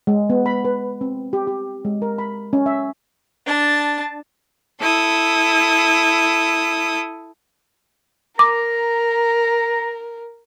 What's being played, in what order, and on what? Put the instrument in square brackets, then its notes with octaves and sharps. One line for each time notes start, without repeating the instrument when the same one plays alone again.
[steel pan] G#3
B3
B5
B4
C4
G4
G4
G#3
A#4
B5
C#4
E5
[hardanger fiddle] D4 A5
[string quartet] E4 A4 D#6
[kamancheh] A#4 [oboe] A#5 [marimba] D6